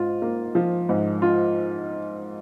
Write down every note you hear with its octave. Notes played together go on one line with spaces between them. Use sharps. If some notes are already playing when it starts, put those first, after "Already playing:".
Already playing: G#2 F4
A#3
F3
G#2
F4